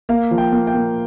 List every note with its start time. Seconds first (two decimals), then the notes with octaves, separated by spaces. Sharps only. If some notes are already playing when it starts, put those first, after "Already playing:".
0.09 A#3 F5
0.31 F3
0.38 G5
0.52 A#3
0.67 G5
0.74 A#3